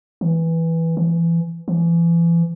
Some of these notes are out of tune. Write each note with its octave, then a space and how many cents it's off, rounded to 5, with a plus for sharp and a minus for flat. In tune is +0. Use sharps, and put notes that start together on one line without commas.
E3 -5
E3 +25
E3 +35